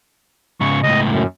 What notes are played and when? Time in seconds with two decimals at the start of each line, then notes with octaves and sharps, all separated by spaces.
0.61 G#2 C#3 C#6
0.83 C#2 A2 D#5
1.10 F#2